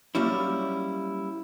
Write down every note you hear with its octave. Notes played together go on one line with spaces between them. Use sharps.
F#3 G3 A#3 C#4 E4